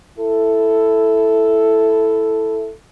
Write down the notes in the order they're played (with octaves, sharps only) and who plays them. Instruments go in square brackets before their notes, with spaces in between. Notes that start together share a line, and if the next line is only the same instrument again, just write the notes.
[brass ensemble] E4 A4